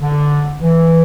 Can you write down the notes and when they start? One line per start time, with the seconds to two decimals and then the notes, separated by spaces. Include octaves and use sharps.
0.02 D3
0.61 E3